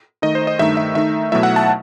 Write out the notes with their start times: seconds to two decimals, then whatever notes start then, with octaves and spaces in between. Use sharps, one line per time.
0.22 D#3 A3 D#4 D#5
0.35 C5
0.47 D#5
0.59 G2 D#3 A3 D#4 E5
0.77 E5
0.95 D#3 A3 D#4 E5
1.32 B2 F#3 A3 E4 E5
1.43 F#5
1.56 A5